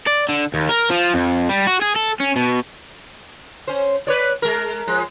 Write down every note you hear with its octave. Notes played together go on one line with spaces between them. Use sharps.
D5
D3
D#2
A#4
F3
F2
G3
F#4
G#4
A4
C#4
B2
C#4 C5
B4 C#5 D5
G#3 A#4
F3 G#3